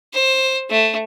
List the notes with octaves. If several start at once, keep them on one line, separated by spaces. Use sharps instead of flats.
C5
A3